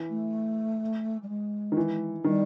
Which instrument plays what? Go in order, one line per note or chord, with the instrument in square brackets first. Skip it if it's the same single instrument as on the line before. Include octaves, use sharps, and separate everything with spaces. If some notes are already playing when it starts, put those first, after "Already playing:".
Already playing: [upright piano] E3
[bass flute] A3
G3
G#3
[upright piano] D#3
E3
[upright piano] D#3 [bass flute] G3